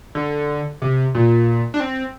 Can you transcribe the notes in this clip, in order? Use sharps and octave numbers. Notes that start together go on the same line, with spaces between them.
D3
C3
A#2
D4
C4